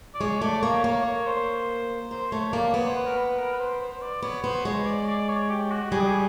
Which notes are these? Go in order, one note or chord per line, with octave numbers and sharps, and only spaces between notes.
D5
G#3 C#5
A3 D5
A#3 C#5
A#3 C#5
C#5
C5
A#3 C5
A3 C#5
A#3 D5
B3 C#5
C5
B4
A#4
B4
A#4
B4
C5
C5
D5
B3 C#5
B3 C5
G#3 C#5
D5
D5
C#5
G4
F#4
G3 G#4
G4
G#4